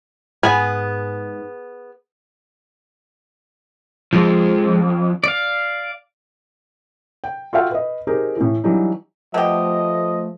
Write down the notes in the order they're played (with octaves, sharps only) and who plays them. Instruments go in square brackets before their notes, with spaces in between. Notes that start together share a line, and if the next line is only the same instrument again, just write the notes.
[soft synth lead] G#2 [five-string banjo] B3 G#4 G#5
[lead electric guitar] F2 [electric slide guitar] F3 G#3
[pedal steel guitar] D5 F5
[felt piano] G5
F4 F#4 A4 E5 F5 G5
B4 D#5
C4 D#4 G4 G#4 A#4
A2 E3
E3 F#3 G3 D4 D#4
[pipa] B2 G4 [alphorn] F3 [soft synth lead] A3 [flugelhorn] D#5